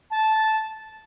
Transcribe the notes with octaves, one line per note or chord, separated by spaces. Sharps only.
A5